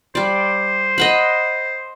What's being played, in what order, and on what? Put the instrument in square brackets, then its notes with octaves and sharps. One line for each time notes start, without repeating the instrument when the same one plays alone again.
[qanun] G3 D5 [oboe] C5
[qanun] D#5 F#5 B5